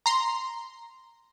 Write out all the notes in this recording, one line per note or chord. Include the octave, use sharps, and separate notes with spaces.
A#5 C6